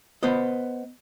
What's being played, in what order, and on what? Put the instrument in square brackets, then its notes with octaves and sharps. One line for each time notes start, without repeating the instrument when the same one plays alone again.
[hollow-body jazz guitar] B3 C5 D#5